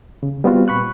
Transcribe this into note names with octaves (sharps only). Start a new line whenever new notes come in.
C#3
G3 B3 C4 F4 F#4
A#2 B5 C#6 F#6